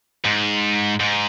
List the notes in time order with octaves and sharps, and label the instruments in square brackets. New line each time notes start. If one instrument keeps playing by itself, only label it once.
[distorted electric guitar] G#2
G#2